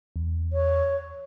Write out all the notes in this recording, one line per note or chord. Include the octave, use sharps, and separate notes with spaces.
E2
C#5